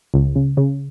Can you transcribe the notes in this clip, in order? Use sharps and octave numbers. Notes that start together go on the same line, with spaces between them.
C#2
C#3
C#3